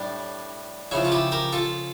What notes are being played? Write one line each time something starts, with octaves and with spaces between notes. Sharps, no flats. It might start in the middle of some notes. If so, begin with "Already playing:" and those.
Already playing: A2 G3 D4
C#3 F3 C#4 E4
F4
E4 G4
G4 A#4
F4 A4